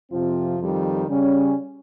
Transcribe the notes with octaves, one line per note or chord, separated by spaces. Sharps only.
F2 C3 F3 C4 F4
F2 D#3 G3
C#3 G3 C#4